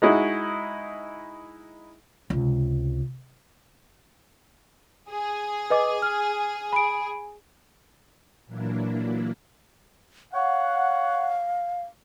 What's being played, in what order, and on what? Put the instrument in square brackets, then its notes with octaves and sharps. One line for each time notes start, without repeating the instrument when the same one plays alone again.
[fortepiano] G#3 D#4 E4 F#4
[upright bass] C#2 C3
[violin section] G#4
[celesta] B4 D#5 D6
F6
B5 D7
[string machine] A#2 E3 F#3 A#3 D4 E4
[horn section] C#5 F#5 [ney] F5